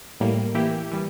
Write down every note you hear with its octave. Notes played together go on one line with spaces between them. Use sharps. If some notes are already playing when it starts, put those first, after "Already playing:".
A2 G3 A#3
E3 A#3 E4 G4
E3 G3